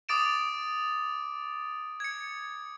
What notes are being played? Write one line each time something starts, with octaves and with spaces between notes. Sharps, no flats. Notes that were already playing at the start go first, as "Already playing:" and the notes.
D6 D#6 A6 D7 E7
G#6 C#7